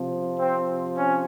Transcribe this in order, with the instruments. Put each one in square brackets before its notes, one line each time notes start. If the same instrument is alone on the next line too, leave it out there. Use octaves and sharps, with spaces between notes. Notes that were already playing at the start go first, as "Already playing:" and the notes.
Already playing: [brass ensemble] C3 F3
C4
C#4